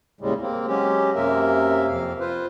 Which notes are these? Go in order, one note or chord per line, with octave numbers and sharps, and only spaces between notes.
D#2 A2 C#3 G3 G#3
A#3 C4
F#3 G#3 C#4 G4
F#2 C3 A#3 A#4 E5
F2 F5
F4 B4 C5